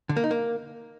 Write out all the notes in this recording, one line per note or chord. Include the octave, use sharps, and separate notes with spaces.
D3
A#3
D#4
A#3